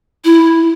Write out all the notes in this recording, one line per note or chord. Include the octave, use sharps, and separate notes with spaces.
E4